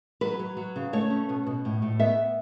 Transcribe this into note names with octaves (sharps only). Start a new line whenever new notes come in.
F#3 B4
F#3
F#3
C#3
A3 C#5
C#4
B2
B2
A2
A2
B3 E5